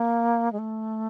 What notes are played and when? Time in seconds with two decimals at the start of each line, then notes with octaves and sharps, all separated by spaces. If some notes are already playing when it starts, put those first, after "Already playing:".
Already playing: A#3
0.52 G#3
0.59 A3